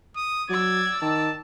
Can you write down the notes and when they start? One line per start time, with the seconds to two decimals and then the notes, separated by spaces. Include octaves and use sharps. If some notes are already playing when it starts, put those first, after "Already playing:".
0.16 D#6
0.50 F#3 D5 E6 G#6
1.02 D#3 A5